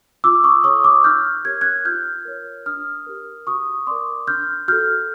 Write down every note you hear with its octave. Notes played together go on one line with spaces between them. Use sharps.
F4 D6 E6
C#6 D#6
A4 C#5 C#6 D#6
D6 E6
D#4 F6 G6
G4 A#4 C#5 G#6
F#6 G#6
F4 F6 G6
A#4 C#5
D4 D#6 F6
G4 A#4
F#4 C#6 D#6
A#4 D5 C6 D6
D4 F6 G6
F#4 A4 F6 G6